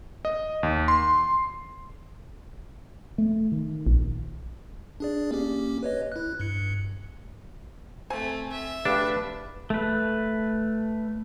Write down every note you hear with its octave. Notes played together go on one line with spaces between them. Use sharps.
D#5
D#2
C6
A3
D#3
A#1
D4 G#4 D5
A#3 C#4 G4
B4 C#5 D#5
E4 F#6
G2 C#7
A3 C4 G#5
E5
A3 D4 G4 B4 F5 A5
A3 B4